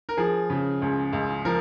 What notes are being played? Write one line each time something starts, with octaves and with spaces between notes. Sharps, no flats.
A#4
F3 G#4
C#3
C#2
C#2
F3 A#4